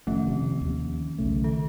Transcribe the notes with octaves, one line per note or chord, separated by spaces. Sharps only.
F1 D#3 F3 A3 C#4
C3
D#2
B1 C#3 A3
D#3 A4